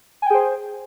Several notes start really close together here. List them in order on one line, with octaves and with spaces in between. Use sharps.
G#5 G5 G#4 C5